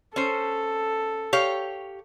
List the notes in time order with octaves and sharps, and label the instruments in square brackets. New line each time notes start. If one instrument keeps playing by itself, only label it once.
[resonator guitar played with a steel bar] C#4 C5 [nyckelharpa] A4
[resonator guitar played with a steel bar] G4 C#5 F5